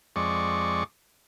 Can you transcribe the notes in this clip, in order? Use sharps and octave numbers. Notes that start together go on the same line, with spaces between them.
F2 G#3 D5 C#6